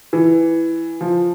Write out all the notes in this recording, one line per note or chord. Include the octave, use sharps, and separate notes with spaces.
E3
F3